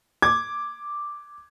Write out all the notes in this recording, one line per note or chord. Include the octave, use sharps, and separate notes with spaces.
D6 G#6